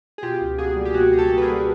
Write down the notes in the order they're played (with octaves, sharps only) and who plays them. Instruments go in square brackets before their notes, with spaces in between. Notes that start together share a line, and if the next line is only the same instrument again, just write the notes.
[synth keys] G#4
B2 F4 G4
C#2
A#3 F#4 G#4
G3
G4
B2 F#4 G#4
C#2 G#4
G4 A4
A#3
B4
G#4 A#4
G3